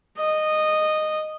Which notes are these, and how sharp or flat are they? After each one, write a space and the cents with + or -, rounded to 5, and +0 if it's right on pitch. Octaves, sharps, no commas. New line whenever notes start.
D#5 -10